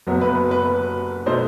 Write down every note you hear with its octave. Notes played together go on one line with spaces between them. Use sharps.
F#1 F#2 F#3 B3
B4
B4
B2 A3 D#4 C5